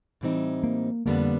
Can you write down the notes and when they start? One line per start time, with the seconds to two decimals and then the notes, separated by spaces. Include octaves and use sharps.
0.21 A2 E3 G3 C4 D#4
0.64 A#3
1.06 F2 D3 G3 A#3 B3 D4